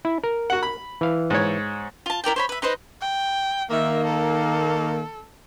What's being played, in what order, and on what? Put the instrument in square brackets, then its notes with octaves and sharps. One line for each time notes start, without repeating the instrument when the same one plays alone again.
[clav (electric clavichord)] E4
A#4
[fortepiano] F#4 F#5
B5
[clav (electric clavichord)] E3 F5
[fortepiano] G#2 C#5
[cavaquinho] F4 A5
E4 A#4 D5 G5
C5 C#5 B5
B4 E5
D#4 B4 C5 D#5
[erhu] G5
[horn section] D#3 A#3 [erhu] E5
[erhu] A4